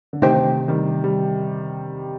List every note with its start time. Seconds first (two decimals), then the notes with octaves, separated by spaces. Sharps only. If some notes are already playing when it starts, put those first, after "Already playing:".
0.13 D3
0.22 C3 D#3 A3 D#4 G4 C5 G5
0.68 D#3 G3
1.04 G3